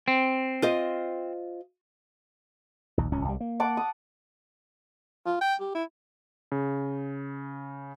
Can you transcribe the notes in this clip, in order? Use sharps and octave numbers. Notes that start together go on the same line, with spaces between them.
C4
F4 C5 D#5
A#1 D#2
D1 C#2 C#4
C2 G3
A#3
F#5 A5 D6
D#6
F4
G5
G4
E4
C#3